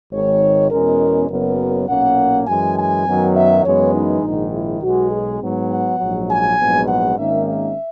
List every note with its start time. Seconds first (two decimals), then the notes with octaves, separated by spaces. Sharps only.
0.12 G#1 G#2 D#3 G#3 C#5
0.71 E2 B2 G#3 C#4 A#4
1.29 F#1 F#2 C#3 F#3 B3 A#4
1.88 B1 A#2 A#3 C#4 F#5
2.47 F#2 E3 G#3 G#5
2.77 G#5
3.05 F#2 D#3 F#3 B3
3.35 E5
3.65 F#2 E3 G#3 B3 C#5
3.94 D#4
4.23 A#1 G#2 D#3
4.53 E4
4.82 B1 B2 G#3 F#4
5.11 G#4
5.41 G#2 F#3 B3
5.70 F#5
5.99 A#1 G#2 F#3
6.29 G#5
6.59 A#1 G#2 F#3 B3
6.88 F#5
7.17 G#1 G#2 D#3 A#3 C#4 E5
7.47 E5